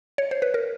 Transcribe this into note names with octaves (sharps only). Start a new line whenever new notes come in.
C#5
C5
B4
A#4